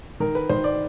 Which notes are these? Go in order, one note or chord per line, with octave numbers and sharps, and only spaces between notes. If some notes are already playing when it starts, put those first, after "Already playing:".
D#3 A#4
B4
D#3 C5
D5